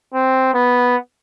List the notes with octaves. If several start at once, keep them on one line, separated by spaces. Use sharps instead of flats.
C4
B3